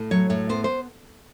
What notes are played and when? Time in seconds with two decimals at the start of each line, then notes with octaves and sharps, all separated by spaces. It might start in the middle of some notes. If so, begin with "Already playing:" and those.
Already playing: A2
0.11 F#3 C#5
0.30 A2 C#5
0.49 B3 C5
0.64 C5